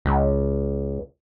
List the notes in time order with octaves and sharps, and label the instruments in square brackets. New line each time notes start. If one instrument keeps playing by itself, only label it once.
[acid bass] C#2